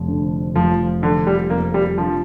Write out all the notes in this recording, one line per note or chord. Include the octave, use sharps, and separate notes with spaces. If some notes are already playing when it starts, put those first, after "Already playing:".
Already playing: F1 F2
D3
F1 F3
D3 F3
G3
F2 A#3
G3
F3 D4